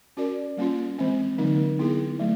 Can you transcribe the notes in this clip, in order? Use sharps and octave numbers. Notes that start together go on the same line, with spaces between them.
C#4 F#4 A#4 D5
G3 A#3 C#4 F4
E3 G#3 C4
D3 F#3 A#3 D#4
B3 E4 G#4
F#3 A3